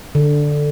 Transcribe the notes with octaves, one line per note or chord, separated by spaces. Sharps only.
D3